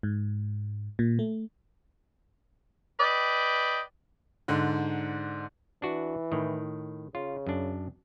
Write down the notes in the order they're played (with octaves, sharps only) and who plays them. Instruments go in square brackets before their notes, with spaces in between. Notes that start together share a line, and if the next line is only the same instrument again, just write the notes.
[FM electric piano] G#2
A#2
A3
[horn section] B4 D5 D#5 G5
[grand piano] G#2 D3
[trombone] E3 [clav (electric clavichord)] D4 F#4
[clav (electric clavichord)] A2 D#3
[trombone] C#3 [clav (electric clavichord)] F4
[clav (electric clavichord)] F#2 D4